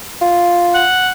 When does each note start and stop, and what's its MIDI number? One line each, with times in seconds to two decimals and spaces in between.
0.21 0.84 65
0.74 1.11 78